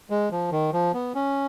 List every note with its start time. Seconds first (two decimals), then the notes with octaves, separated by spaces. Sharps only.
0.10 G#3
0.31 F3
0.52 D#3
0.73 F3
0.94 B3
1.15 C#4